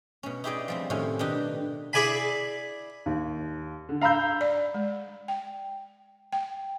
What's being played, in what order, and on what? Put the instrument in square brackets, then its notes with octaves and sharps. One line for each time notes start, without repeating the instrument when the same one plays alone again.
[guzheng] B2 C#4
D#4 E4 G4 G#4 D5 D#5
F3 G3 C4
A2 C3 D#3 C#4
B2 D#3 G3 D4 D#4 G4
[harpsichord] E4 G#4 D5 G#5 B5
[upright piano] D#2
D3
F5 A#5 B5 E6 G6
[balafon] D5
G#3
G5
G5